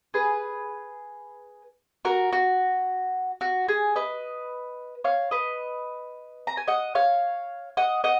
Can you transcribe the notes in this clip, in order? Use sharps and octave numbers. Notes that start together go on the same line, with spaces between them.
G#4 B4
F#4 A#4
F#4
F#4
G#4
B4 D#5
C#5 F5
B4 D#5
A#5
G#5
D#5 F#5
C#5 F5
D#5 F#5
D#5 F#5